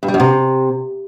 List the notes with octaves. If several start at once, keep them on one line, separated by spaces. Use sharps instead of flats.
G2
G3
F#2
C3